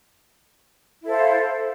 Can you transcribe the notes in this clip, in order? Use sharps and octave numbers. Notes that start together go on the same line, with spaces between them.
E4 A4 C5 F5